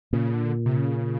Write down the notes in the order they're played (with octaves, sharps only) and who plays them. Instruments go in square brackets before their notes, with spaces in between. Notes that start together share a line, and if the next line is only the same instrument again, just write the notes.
[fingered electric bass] A#2 [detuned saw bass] C#3
[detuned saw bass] D3
C3
C#3